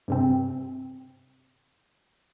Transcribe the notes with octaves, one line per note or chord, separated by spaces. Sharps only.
G2 C3 C4